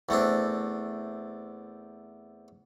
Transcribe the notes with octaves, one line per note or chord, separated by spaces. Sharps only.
E2 A3 C4 D4